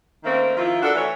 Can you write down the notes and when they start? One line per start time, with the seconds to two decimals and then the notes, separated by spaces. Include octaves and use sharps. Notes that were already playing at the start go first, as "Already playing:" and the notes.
0.23 D#3 A3 A#3 C4 C#4
0.57 D#3 F3 E4 F4
0.82 D4 F#4 A4 A#4 D5
0.95 E3 A3 C#5 E5